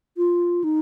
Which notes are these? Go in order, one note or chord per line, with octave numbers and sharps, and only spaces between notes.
F4
D#4